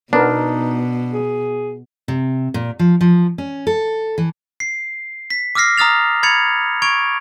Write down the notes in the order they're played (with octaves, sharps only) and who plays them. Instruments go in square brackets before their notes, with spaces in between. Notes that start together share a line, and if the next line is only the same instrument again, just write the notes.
[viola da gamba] B2 [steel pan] B3 A#4 [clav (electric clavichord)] D4 [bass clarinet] D#4
[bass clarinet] G#4
[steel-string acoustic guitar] C3
A#2
F3
F3
C#4
A4
E3
[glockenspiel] C7
B6
D6 E6 F6 A#6 C7
A#5 D#6 F6 A6 F7
B5 G#6 A6 C#7 F7
C#6 G#6 D7 F7